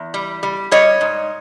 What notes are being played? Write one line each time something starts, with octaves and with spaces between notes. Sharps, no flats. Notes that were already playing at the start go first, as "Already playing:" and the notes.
Already playing: E2
G3
G3
G3 C#5 D#5
G#2